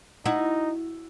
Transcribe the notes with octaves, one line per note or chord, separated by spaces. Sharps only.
D#4 E4 F#4